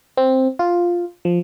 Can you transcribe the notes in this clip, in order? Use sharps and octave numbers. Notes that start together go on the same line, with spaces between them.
C4
F4
F3